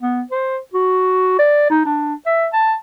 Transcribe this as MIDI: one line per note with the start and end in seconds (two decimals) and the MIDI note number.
0.01 0.22 59
0.31 0.58 72
0.74 1.35 66
1.39 1.70 74
1.70 1.83 63
1.86 2.14 62
2.26 2.48 76
2.53 2.74 81